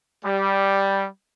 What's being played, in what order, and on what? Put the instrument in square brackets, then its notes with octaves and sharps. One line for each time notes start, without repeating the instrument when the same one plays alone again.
[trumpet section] G3